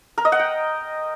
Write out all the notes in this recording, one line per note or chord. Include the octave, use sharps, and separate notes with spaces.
A#4
D#5
F#5
G5